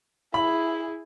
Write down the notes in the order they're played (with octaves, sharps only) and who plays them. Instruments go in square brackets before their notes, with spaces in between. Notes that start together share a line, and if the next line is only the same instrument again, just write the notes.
[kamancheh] E4 G#4 [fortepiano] B5